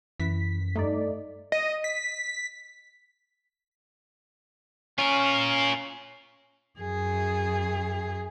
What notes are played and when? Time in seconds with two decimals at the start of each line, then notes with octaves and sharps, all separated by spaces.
0.20 F#2 E3 B6
0.75 G2 A3 D#4 D5
1.52 D#5
1.84 B6
4.98 C#4 F4 A#4
6.80 F#2 G#4